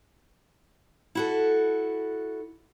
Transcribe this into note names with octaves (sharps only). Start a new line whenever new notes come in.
E4 F#4 A4